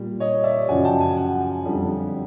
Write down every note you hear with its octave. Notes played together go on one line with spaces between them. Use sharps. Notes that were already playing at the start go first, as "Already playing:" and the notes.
Already playing: A#2 G3
C#5 D#5
D5 E5
F#2 C#3 F3 F#5 G#5
G5 A5
F#5 G#5
F#5 G#5
F2 D3 G3